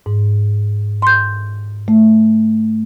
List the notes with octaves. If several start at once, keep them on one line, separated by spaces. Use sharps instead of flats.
G#2
C6 G6
A3